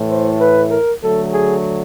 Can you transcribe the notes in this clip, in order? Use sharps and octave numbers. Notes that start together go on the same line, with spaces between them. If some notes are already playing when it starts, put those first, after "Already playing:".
Already playing: A2 E3 A3
C5
B4
A#4
D3 F#3 A3 A4
G#4